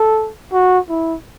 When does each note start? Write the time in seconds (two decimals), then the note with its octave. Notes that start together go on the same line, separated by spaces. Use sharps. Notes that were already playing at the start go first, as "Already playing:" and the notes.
Already playing: A4
0.53 F#4
0.89 E4